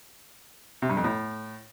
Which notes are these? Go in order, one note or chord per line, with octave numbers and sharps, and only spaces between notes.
C3
G2
F2
A2